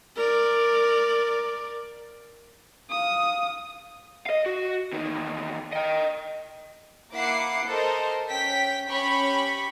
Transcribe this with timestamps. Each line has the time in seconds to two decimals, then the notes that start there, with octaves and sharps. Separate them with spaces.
0.17 A#4 D5
2.90 F5 D#6
4.26 D#5 F5
4.46 F#4
4.93 E2 D#3
5.73 D#5 G5
7.13 A#3 E4 F#5 D6 C7
7.65 A4 A#4 C5 D#5
8.28 C#4 G5 B6
8.89 C#4 G4 B5 C#6